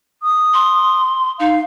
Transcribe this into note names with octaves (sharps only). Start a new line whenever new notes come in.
D#6
C6
D#4 F5